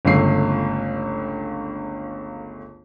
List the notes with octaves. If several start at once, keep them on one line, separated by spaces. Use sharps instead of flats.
G1 C#2 A3 C7